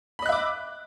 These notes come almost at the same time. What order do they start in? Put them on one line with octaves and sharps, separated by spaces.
B5 D#5 F#6 E5 D6